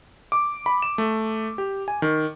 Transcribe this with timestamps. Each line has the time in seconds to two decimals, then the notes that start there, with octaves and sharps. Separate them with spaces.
0.32 D6
0.66 B5
0.82 E7
0.98 A3
1.58 G4
1.88 G#5
2.02 D#3